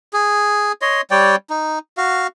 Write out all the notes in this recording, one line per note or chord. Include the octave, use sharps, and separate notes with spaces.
G#4
C#5 D#5 C6
G3 C#5 D5 G5
D#4
F#4 F5